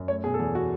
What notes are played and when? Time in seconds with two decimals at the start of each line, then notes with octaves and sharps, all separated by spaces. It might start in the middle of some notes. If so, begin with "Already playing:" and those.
Already playing: F#2
0.08 A3 C#5
0.23 B2 G#4
0.34 A4
0.39 E2 G#4
0.55 F#4